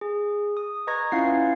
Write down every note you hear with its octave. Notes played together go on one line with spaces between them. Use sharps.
G#4
D#6
B4 D#5 A#5 C#6 G#6 A#6
C#4 E4 F4 F5 F#5 C7